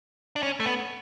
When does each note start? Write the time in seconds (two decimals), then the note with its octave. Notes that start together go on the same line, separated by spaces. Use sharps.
0.36 D4
0.43 C#4
0.60 A3
0.65 B3